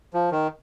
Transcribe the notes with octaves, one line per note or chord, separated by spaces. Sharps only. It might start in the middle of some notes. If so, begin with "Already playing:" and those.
F3
D#3